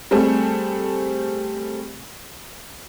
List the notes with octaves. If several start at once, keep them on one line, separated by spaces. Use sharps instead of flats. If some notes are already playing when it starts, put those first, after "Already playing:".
G3 A3 C4 G#4 A4